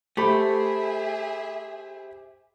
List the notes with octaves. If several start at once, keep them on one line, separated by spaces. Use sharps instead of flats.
A3 G4 G#4 C5 E5 B5